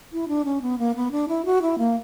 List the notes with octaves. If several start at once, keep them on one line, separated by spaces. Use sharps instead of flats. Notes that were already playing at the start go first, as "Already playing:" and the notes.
E4
D4
C#4
B3
A#3
B3
D4
E4
F#4
E4
A#3